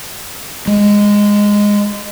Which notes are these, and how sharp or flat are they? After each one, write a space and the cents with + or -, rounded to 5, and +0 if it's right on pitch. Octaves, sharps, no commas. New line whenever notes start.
G#3 -10